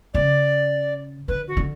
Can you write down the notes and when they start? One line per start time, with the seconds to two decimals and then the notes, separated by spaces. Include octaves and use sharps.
0.14 C#3 D5
1.28 D3 B4
1.48 F#4
1.57 D3